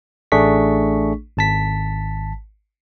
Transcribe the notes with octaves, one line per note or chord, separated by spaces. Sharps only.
A1 A3 D4 G#4 C#6 B6
G#1 A5 B6